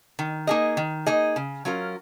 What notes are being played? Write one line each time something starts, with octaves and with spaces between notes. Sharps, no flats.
D#3
A#3 D#4 G#4 D#5
D#3
A#3 D#4 G#4 D#5
C#3
F#3 C#4 F4 A#4